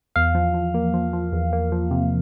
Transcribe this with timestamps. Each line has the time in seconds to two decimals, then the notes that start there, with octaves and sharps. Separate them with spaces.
0.16 E2 F5
0.35 F3
0.54 F3
0.74 A#3
0.94 F3
1.13 F3
1.32 E2
1.53 A#3
1.72 F3
1.91 C3